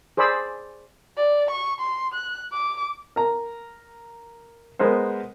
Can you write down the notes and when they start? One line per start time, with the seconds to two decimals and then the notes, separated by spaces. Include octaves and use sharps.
0.17 G#4 C5 D5 B5 E6
1.17 D5
1.50 C#6
1.80 C6
2.14 F#6
2.52 D6
3.16 A#4 A#5
4.79 G#3 B3 A#4 C5